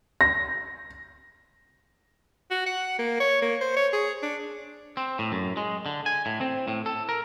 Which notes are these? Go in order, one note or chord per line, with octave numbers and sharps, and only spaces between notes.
A#6
F#4
F#5
A#3
C#5
A#3
C5
C#5
G#4
D4
C4
A2
F#2
G#3
D3
G#5
A2
C4
A2
A4
A#4